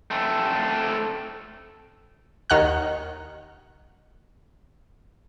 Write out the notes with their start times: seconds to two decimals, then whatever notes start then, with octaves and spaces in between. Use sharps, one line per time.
0.11 A3 C4
2.50 D#2 D#3 F#5 F6 F#6